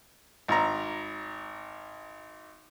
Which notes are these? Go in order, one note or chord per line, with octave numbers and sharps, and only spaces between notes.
G#1 A#5